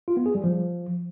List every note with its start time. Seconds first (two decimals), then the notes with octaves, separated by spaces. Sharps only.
0.08 F4
0.17 B3
0.26 G#4
0.35 G3
0.44 F3